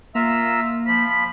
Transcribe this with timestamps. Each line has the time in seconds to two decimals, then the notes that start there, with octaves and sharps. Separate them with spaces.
0.15 A#3 F4 E5 A#5 E6
0.87 F3 B5